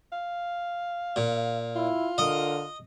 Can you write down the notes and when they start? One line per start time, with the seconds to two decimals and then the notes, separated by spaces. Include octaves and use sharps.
0.12 F5
1.16 A#2
1.76 E4 F4
2.18 D3 A#4 D#5